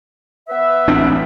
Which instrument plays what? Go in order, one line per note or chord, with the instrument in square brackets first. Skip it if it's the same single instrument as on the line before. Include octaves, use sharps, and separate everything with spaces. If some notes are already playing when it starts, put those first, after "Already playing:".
[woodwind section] B3 B4 E5
[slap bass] A1 C4 D4